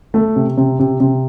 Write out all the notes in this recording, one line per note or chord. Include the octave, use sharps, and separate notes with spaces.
A3
C3
C3
C3
C3